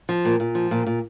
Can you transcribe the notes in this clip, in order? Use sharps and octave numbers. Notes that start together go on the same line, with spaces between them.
F3
A#2
A#2
F3
A#2
A#2